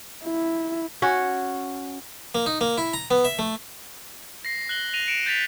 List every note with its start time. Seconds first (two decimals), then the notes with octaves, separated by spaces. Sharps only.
0.25 E4
1.02 C#4 F#4
2.35 A#3
2.46 D#4
2.61 A#3
2.78 E4
2.93 A#5
3.11 B3
3.25 E5
3.39 A3
4.45 A#6 C7
4.69 F#6 A#6 F#7 G7
4.93 A#6 D#7 F7
5.07 C#7 D7 E7
5.26 G6 A6 B6 F7